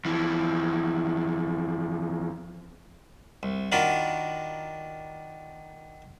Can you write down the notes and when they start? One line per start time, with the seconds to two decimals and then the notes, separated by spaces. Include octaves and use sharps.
0.05 F2 E3
3.43 C2
3.72 D#3 D4 F4 F#4 A#4 B5